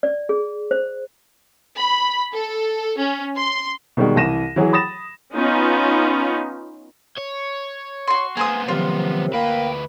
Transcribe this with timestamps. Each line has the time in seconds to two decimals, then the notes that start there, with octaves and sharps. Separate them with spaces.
0.03 D5
0.29 G#4
0.71 C5
1.77 B5
2.33 A4
2.98 C#4
3.36 C6
3.97 B2 D#3 G3 G#3
4.16 C2 E3 A#6 D#7 E7
4.56 E3 F#3 F#4 G#4
4.73 B5 D#6 A6 A#6 E7
5.35 B3 C#4 D#4 F4
7.18 C#5
8.08 F#4 C6
8.37 A#3 B3 G#4 C5 D#6
8.68 C3 D#3 F3 F#3 F4
9.34 D2 A#3 B4 G5